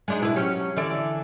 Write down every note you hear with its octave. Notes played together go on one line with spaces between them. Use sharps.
G#3 D4 D#4
B2 E4 B4
F#3 C#4 G4
D3 E3 D5